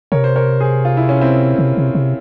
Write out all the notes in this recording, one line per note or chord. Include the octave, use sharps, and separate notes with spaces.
C3 A#4 C#5
C5
A#4 C#5
G#4 C5
F4
E4
C#4
C4 E4
C3
C3
C3